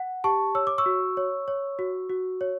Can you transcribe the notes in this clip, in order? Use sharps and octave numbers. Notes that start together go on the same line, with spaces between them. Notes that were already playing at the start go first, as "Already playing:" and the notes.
Already playing: F#5
G4 A5 C#6
C#5 E6
D6
C#6 E6
F#4
C#5
C#5
F#4
F#4
C#5